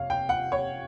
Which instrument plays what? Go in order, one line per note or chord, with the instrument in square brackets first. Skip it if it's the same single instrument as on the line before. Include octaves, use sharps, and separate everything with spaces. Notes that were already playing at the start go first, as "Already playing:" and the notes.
Already playing: [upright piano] F1 C#5 F5
G5
F#5
C#5